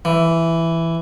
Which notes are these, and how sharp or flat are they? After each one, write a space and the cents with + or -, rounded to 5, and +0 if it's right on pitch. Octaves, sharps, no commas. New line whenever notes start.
E3 +5